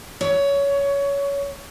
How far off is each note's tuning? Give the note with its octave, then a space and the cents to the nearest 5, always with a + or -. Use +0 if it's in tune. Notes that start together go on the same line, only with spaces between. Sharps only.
C#5 +20